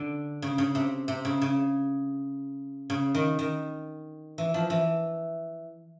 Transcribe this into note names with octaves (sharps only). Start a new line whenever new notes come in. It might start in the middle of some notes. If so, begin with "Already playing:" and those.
Already playing: D3
C#3
C#3
C3
C3
C#3
C#3
C#3
D#3
D#3
E3
F3
E3